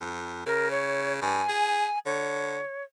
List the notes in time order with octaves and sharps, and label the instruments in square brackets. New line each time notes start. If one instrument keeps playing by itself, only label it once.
[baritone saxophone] F2
[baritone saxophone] C#3 [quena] A#4
[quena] C#5
[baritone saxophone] G2 [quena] G#5
[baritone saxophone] G#4
[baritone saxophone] D3 [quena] C#5